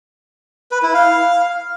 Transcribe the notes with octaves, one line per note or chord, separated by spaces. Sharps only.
B4
E4
F5